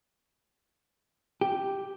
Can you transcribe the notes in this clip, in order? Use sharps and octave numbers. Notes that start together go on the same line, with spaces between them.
G4